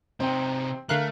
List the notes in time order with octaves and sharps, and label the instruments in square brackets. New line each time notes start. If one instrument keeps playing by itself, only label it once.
[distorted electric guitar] C3 D#4 [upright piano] C4 G5
[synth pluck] D3 F5 F#6 [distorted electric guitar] A3 [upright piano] A#4